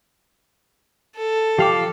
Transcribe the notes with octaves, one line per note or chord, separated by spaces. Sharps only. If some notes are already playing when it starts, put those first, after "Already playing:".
A4
F3 G4 F5 D6